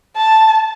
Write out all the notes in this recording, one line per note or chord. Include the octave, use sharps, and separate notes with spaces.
A5